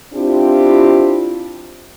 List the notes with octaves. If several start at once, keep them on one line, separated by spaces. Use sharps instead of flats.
C4 D4 E4 F4 G4